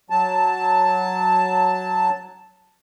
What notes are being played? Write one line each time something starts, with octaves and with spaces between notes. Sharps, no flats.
F#3 A5